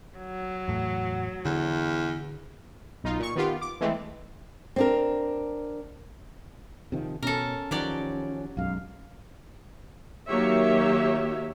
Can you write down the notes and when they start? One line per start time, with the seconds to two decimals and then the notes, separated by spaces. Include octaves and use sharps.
0.18 F#3
0.68 E2 A2
1.45 E2 D3
3.04 B1 D#4 F4
3.19 A#2 C#6
3.36 D#3 B3 F4 G4
3.61 D6
3.81 E3 G#3 A3 C4
4.76 C4 D4 A#4
6.92 C3 D#3 F3
7.22 B2 C#4 A4 A#4
7.71 D#3 F3 F#3 G4 D5
8.57 B1 F#2 G#3 F5
10.27 D#3 F#3 A#3 G4 C#5 E5